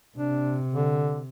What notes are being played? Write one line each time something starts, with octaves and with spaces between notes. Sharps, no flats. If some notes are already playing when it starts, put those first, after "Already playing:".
C3 D4
D3